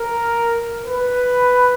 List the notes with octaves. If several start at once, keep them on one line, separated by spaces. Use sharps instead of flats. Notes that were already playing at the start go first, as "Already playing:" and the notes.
Already playing: A#4
B4